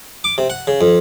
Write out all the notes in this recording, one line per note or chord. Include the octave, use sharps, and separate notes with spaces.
D6
C3
F#5
C#3
F2